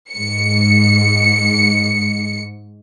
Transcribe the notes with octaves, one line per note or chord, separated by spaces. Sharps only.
G#2 C#7